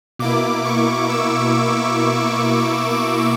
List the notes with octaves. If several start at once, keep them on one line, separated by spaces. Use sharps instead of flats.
B2 A#3 E4 D6
C#6
E6
D6